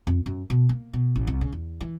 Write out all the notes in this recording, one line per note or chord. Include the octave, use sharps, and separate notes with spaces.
F2
F#2
B2
A#3
B2
A1
C2
C#3
E2
E3